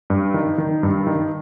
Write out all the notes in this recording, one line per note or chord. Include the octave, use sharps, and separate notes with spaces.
G2
D#3
D#3
G2
D#3